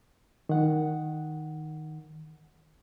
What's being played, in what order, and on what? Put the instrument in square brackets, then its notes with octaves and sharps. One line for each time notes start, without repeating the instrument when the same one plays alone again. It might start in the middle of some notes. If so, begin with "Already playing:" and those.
[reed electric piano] D#3 F#5